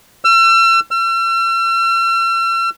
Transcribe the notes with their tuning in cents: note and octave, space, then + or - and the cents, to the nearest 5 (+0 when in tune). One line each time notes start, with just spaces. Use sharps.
E6 +40
E6 +45